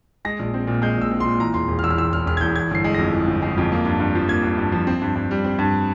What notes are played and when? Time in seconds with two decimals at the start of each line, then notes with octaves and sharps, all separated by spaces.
0.25 G#3 A#6
0.39 A#1
0.54 C4
0.67 A#2
0.82 G#3 G6
0.97 A#1 E6
1.11 C4
1.20 A#2 C6
1.40 E3 A#5
1.54 E1 C6
1.68 E1
1.79 F6
1.83 E2 E6
1.91 F6
1.98 E3 E6
2.13 E1 F6
2.26 E1 F6
2.37 G#6
2.41 E2 G6
2.56 E3 G#6
2.71 G1 C7
2.84 G#3
2.95 F2 A#6
3.13 E3
3.27 G1
3.42 G#3
3.57 F2
3.72 A#3
3.85 G2
4.00 G2
4.15 F3
4.29 A#3 G#6
4.43 G2
4.58 G2
4.72 F3
4.87 C4
5.02 G2
5.16 G2
5.31 G3
5.44 C4
5.59 G2